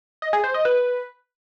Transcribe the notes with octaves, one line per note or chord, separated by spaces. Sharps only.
D#5
G#4
C5
D#5
B4